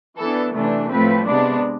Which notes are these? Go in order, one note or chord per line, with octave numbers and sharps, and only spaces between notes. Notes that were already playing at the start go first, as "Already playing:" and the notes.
E3 B3 D4 A4
C3 E3 A3 D4
A2 F3 A3 C4 B4
C3 G#3 B3 D4